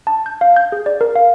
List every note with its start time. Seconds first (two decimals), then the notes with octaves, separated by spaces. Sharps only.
0.07 A5
0.26 G6
0.41 F5
0.56 G6
0.72 G#4
0.86 D5
1.01 A#4
1.16 F5